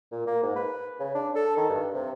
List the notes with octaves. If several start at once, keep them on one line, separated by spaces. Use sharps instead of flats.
A#2
A#3
G#2
B4
C#3
D4
A4
D#3
G2
C3